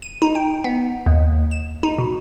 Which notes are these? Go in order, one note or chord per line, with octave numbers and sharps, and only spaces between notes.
D#7
D#4
G5
B3
D#2
E7
D#4
B2